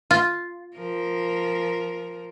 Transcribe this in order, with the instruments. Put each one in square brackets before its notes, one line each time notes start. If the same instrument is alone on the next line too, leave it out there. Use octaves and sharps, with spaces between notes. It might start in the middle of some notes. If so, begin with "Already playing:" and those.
[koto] F4
[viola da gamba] F3 A#4